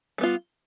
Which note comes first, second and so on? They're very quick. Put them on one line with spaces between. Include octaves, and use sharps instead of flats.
G3 B3 F4